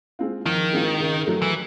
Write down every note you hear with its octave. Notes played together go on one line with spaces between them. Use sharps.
G#3 C4 F4
D#3 F3
G#3 C4 F4
C#3
F#3 A3
E3